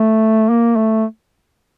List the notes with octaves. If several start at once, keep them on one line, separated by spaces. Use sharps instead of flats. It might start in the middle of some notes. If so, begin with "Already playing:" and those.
Already playing: A3
A#3
A3